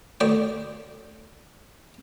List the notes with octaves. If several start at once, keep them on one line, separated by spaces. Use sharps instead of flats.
D2 D5 G5